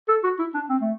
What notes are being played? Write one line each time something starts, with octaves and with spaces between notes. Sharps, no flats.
A4
F#4
E4
D4
C4
A3